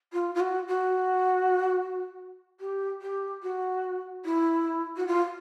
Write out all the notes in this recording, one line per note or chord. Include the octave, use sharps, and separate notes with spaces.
F4
F4
F#4
F#4
G4
G4
F#4
E4
F#4
F4